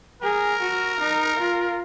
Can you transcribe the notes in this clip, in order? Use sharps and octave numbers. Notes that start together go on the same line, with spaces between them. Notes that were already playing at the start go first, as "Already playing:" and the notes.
G#4 A#4
F#4
D#4
F4